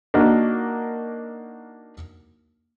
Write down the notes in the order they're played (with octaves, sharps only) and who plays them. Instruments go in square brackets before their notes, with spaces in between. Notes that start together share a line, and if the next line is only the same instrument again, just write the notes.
[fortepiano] A#3 D4 D#4 F#4 A#4